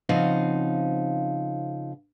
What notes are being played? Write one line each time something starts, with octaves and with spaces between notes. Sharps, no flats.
C#3 F3 C4 D#4 F5 F#5